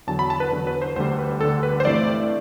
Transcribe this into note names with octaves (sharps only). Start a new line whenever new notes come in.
E2 D3 F#3 A5
B5
A5
B4
E2 D3 F#3
B4
C5
D2 D3 G3 C5
B4
D2 D3 G3 A4
B4
C5
G2 E3 A3 C4 E4 D5